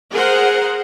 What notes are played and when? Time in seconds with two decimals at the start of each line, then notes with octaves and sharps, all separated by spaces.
0.12 G#4 A#4 C5 F#5